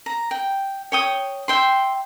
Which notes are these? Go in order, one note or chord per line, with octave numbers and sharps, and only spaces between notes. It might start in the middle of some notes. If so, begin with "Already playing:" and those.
A#5
G5
C#5 G5 D#6
E5 G5 C6